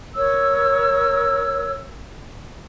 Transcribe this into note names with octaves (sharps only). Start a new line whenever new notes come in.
A#4 C#5 E6